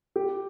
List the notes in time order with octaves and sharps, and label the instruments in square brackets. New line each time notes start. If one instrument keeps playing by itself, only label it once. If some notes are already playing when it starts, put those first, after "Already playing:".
[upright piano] G4